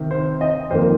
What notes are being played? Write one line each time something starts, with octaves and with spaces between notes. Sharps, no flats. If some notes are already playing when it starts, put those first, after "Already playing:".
Already playing: C3 D#3
C5
D#5
F2 D#3 A#3 C5